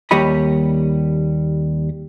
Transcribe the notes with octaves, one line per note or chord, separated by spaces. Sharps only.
D#2 G3 C#5 D#5 B5